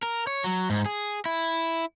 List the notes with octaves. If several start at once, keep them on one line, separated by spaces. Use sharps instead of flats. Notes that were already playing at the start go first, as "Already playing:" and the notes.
A#4
C#5
F#3
G#2
G#4
E4